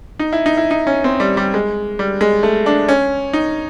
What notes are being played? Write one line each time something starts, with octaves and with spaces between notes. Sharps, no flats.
D#4
E4
D#4
E4
D#4
C#4
C4
G3
G3
G#3
G3
G#3
A3
D4
C#4
D#4